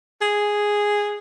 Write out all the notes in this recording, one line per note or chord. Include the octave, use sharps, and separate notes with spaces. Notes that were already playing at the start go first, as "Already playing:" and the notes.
G#4